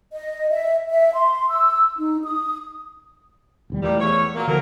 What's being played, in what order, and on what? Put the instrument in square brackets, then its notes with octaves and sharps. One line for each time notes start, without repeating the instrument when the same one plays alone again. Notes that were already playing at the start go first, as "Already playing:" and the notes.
[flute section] D#5
E5
E5
C6
E6
D#4
D#6
[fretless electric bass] E1 D#2 G3
[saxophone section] A#2 G3 [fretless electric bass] E3 A3
[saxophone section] E2 C#5
A#2 F#3 A#3
[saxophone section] A2 F#3 A#4 [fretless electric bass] D3 F3 A#3